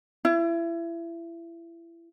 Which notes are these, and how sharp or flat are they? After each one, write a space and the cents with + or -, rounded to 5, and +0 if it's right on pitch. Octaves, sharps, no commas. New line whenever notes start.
E4 +30